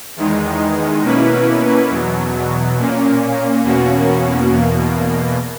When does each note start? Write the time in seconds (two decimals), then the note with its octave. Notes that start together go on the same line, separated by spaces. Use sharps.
0.16 E2 D#3 G#3 D#4
1.03 B2 A#3 C#4 E4 B4
1.89 E2 B2 F#3
2.77 A#2 A#3 C#4
3.64 E2 B2 A#3 C#4 F#4
4.50 E2 B2 A#3